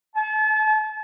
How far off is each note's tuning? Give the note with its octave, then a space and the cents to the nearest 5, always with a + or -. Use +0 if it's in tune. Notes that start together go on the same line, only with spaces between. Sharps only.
A5 -35